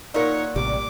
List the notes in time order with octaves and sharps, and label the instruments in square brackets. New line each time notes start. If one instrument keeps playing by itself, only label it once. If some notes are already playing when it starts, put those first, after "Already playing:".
[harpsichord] A#2 [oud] D#4 A#4 [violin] C#5 F#5
[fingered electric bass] A1 C3 [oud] G3 [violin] D6